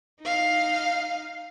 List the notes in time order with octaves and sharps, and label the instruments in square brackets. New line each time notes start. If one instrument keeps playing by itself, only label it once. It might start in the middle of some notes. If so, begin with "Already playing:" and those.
[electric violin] D#4 F5